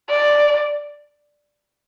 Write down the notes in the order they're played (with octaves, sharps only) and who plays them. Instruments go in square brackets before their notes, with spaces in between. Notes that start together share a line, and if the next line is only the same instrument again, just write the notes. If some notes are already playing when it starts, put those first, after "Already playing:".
[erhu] D5